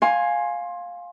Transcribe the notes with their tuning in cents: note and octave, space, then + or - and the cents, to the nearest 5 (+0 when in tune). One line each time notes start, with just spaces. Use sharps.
F5 +10 G#5 +0 C6 +20